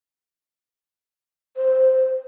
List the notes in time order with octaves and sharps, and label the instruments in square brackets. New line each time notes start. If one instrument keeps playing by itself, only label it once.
[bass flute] C5